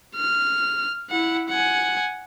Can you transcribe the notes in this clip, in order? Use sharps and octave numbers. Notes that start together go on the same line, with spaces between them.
F6
E4 F#5
F#5 G#5